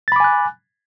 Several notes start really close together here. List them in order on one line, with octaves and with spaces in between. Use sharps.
A6 B5 D6 G#5 F#6